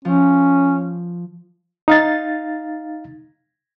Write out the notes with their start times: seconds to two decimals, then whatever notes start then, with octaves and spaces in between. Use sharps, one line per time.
0.05 F3 C#4
1.88 D#4 F5 A6